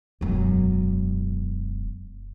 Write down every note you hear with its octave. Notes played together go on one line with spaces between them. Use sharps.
E1 F#2